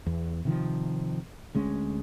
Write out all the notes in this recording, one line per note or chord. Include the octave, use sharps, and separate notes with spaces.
E2
C3 D#3 F3
D2 G#3 C#4